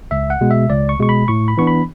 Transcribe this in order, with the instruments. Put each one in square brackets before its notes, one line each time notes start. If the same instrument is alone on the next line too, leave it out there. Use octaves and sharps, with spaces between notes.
[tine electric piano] C#2 E5
F#5
B2 G#3
E5
C#2 D5
C#6
B2 G#3 C#6
B5
A2 C#6
B5
E3 B3 D4 C#6
B5